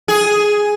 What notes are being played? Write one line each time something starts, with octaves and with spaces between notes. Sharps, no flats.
G#4